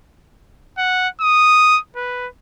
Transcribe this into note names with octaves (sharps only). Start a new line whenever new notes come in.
F#5
D#6
B4